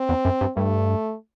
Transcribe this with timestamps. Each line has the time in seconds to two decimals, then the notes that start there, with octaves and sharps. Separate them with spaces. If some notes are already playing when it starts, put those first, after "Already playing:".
Already playing: C4
0.09 E2
0.25 F#2
0.41 G2
0.57 G2 A3